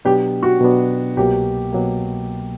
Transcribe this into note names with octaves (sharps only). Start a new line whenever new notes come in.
B2 F#3 B3 D4 G4
F#4
B2 F#3 B3 D4
C2 B2 F#3 A#3 G4
B2 F#3 A#3